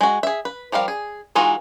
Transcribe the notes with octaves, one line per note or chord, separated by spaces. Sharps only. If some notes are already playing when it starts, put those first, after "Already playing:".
G#3 F#4
G#4 E5
B4
F3 G3 A#4 F5
G#4
E3 G#3 D#4 F4 F#4